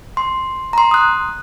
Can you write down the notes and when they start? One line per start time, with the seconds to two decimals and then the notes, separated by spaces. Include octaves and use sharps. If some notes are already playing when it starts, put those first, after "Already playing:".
0.17 C6
0.73 A#5 C6
0.91 D#6 F#6